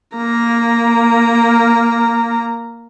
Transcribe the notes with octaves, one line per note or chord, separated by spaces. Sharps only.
A#3 A#5